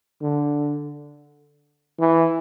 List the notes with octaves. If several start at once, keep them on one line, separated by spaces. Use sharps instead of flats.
D3
E3